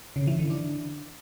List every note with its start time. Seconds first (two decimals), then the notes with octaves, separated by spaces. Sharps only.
0.16 C#3
0.27 E3
0.39 D3
0.50 D4